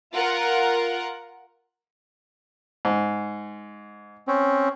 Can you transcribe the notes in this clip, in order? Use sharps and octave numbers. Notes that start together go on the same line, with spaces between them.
F4 A#4 F#5
G#2
C4 C#4